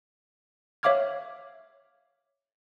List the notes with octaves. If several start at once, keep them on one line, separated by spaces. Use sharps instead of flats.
C#5 E5 F5 D6 F6 G#6